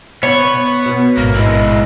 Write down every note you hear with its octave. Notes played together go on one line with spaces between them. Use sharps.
B3 C#5
B2
A1 G#2 A#3
E3 G#3